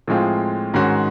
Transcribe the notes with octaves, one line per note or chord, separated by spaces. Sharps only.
A2 F3 G#3 C4 F4
G#2 D#3 G#3 C#4 F#4